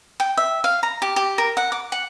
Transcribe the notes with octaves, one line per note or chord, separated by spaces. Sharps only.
G5
E5
F5
A#5
G4
G4
A#4
F#5
D6
F#5